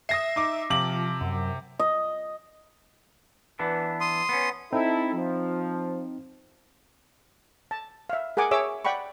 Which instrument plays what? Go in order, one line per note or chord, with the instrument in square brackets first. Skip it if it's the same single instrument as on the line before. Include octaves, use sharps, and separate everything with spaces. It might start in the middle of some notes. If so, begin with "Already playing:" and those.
[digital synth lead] E5 [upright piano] D#6 A#6 C7
[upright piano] D#4 D6
[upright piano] C3 D6 F#7 [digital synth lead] F3
[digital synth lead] F#2
[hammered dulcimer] D#5
[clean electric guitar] E3 B3 D4
[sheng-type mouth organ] C6 D#6
[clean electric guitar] B3 C#4
[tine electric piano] C4 D#4 [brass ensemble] E4 A4
[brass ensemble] F3
[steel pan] A5
E5 F5
G#4 A#4 F#5 G#5 D6
G#4 C#5 E5 D6 E6
D5 F#5 G5 B5 C#6